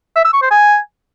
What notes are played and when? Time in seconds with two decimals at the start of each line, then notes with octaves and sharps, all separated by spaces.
0.16 E5
0.25 E6
0.33 C#6
0.42 C5
0.51 G#5